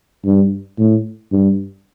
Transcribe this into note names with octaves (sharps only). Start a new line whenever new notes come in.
G2
A2
G2